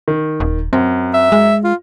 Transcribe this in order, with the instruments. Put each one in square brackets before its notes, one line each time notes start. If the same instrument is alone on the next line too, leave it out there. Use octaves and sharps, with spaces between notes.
[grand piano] D#3
[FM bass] D#1
[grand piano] F#2 [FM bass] C4
[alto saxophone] E5
[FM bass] G#3
[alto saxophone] F4